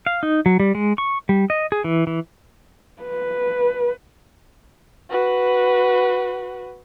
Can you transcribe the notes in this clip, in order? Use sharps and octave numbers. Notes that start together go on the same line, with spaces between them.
F5
D#4
F#3
G3
G#3
C#6
G3
D#5
G#4
E3
E3
B4
F#4 B4